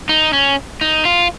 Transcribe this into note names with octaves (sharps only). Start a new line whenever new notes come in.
D#4
C#4
D#4
F4